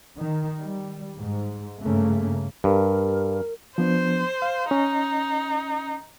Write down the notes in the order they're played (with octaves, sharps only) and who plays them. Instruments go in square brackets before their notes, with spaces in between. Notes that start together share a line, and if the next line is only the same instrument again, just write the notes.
[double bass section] D#3
G3
G#2
G2 C#3 A3 A#3
[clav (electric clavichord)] G2 [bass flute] A#4
[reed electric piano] F3 B3 D4 [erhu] C5
[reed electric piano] F5
[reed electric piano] C#4 [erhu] D#4